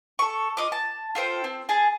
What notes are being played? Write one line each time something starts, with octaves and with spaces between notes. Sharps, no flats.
A4 C#6
F4 D#5 D6
A5
F4 A4 C5 G5
C4
G#4 G#5 A5